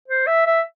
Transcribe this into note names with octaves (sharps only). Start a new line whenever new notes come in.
C5
E5
E5